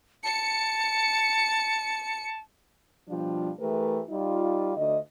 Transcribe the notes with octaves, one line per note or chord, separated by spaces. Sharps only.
A5 C#7
B2 F3 G3 D4 F4
E3 A3 G4 A#4 B4
G3 D#4 F4
D2 D#5